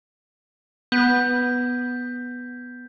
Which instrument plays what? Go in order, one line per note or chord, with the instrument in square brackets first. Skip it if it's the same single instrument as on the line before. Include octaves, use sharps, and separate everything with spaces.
[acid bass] B3 [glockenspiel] G6 B6